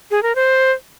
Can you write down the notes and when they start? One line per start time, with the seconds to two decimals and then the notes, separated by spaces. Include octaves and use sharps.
0.11 G#4
0.23 A#4
0.35 C5